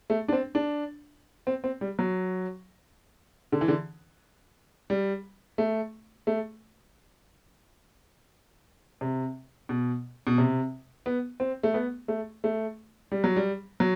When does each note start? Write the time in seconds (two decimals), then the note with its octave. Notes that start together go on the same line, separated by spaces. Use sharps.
0.10 A3
0.28 D4
0.33 C4
0.55 D4
1.47 C4
1.64 C4
1.81 G3
1.99 F#3
3.52 D3
3.61 E3
3.68 D3
4.90 G3
5.58 A3
6.27 A3
9.01 C3
9.69 B2
10.27 B2
10.38 C3
11.06 B3
11.40 C4
11.63 A3
11.74 B3
12.08 A3
12.44 A3
13.12 G3
13.24 F#3
13.36 G3
13.80 F#3